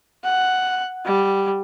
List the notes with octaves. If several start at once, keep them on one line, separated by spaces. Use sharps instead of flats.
F#5
G3